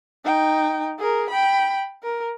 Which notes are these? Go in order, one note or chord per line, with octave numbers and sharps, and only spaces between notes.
D#4 G5
G#4 A#4
G5 B5
A#4